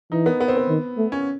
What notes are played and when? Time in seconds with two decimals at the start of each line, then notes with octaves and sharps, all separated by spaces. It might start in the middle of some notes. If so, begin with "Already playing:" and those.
0.12 E3 D#4
0.26 B3
0.40 B3
0.48 C4
0.57 B3
0.69 D#3
0.97 A3
1.12 C#4